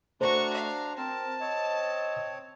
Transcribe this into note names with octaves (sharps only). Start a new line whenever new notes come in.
A3 D4 F#4 C5 A#5 C#6
F5
C4 A#4 A5
C4 C#5 D#5